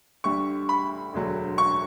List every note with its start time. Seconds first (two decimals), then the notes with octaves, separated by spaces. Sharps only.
0.24 D2 D3 G3 C#6
0.69 B5
1.13 E1 D2 D3 F#3
1.58 C#6